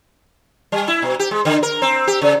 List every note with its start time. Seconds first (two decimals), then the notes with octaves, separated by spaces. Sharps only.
0.72 G3
0.88 E4
1.02 B2
1.19 G4
1.31 G#3
1.45 D3
1.63 A#4
1.82 C4
2.07 G4
2.22 C#3